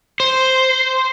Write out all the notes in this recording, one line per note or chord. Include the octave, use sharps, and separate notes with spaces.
C5